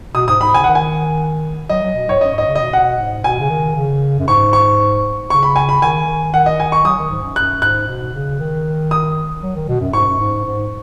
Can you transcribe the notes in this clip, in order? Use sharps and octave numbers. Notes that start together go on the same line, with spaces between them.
B2 D#6
G#2 D#6
G#2 B5
C#3 G#5
D#3 F#5
G#5
F#3 D#5
F#3
B2
G#2 C#5
F#2 D#5
G#2 D#5
C#3
B2 D#5
B2 F#5
G#2
B2 G#5
C#3
D#3
C#3
F#2
G#2 C#6
C#6
C#3 C#6
B5
G#5
B5
D#3 G#5
D#3
D#3 F#5
D#5
G#5
C#6
F#3 D#6
D#3
G#2
F#2
F#2 F#6
G#2 F#6
B2
C#3
D#3
D#6
F#3
D#3
B2
F#2
G#2 C#6
F#2
G#2
G#2